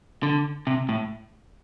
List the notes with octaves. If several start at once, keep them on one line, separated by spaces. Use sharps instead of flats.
D3
C3
A2